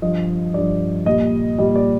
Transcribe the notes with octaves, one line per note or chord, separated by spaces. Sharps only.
G2 F3 D#5
G2 F3 D5
A#2 G3 D#5
A#2 G3 D#5
D5